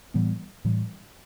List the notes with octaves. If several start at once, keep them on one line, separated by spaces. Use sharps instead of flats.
A2 E3 G3 B3
A2 E3 G3